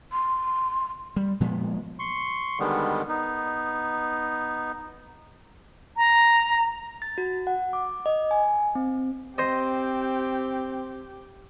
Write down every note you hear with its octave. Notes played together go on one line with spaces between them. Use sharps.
C6
G3
A#2 F3 G#3 B3
C6 C#6
D3 D#3 G3 G#3 B3
B3 D#4
A#5
A6
F#4
F#5
D6
D#5
G#5
C4
C4 G4 C5 D#5